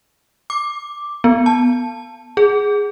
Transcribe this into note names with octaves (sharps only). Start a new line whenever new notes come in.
D6
B3
A5
G#4